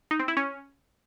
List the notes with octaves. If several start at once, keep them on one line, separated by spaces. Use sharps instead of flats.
D#4
C4
E4
C#4